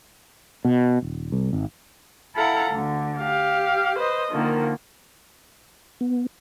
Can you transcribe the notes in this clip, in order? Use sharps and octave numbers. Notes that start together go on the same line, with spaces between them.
B2
D#1
C2
G#1
E4 A4 F5 F#5 A#5
D2 D3
G4 F5
B4 C5 D#5
D3 D#3 F3 A#3
B3